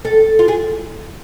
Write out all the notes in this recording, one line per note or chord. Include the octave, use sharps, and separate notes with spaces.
A4
F4
G#4